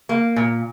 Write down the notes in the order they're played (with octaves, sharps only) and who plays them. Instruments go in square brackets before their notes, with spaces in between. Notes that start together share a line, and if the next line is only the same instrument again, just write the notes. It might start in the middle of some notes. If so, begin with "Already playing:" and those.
[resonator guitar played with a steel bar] A#3
A#2